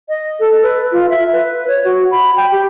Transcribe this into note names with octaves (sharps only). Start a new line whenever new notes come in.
D#5
A4
B4
F4
E5
B4
C#5
F#4
B5
G5
G4